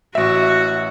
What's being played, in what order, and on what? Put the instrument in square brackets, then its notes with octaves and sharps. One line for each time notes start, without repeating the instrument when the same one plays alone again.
[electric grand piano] A1 E5 [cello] F#4